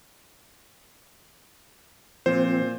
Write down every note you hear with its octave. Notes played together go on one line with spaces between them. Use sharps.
A#2 F3 C4 C5